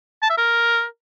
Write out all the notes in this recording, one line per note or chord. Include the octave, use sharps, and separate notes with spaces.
A5
E5
A#4